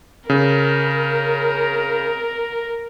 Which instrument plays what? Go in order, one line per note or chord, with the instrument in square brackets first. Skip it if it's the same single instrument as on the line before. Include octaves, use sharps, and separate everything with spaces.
[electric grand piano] C#3 [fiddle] A#4